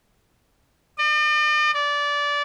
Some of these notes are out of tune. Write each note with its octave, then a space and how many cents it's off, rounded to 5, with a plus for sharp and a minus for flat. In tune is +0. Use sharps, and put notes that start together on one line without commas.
D5 +45
D5 -20